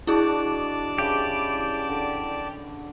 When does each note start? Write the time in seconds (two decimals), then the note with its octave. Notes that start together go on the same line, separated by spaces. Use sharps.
0.07 D4 E4 F#4 G#4 D5 D#5 A5
0.98 C#3 E3 G4 B5
1.89 D3